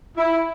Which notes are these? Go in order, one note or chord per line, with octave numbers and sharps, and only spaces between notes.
E4